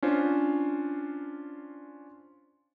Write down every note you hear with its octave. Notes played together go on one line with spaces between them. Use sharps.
C#4 D4 F4 C5